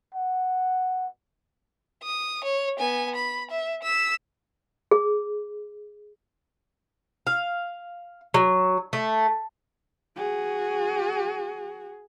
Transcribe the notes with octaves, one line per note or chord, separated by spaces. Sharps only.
F#5
D#6
C#5
B3 G#5
B5
E5
E6 B6
G#4
F5
F#3
A3
F#4 G#4